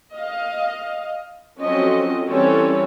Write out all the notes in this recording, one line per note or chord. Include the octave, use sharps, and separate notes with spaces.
D#5 F5
F3 F#3 C4 C#4 A4 D#5
E3 G3 C4 C#4 A4 C#5